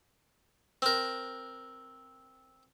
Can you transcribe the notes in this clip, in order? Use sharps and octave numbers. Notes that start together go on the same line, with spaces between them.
C4 A#4